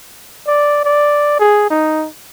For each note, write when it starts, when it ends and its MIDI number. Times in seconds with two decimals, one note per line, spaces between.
0.47 0.84 74
0.84 1.38 74
1.40 1.66 68
1.70 2.07 63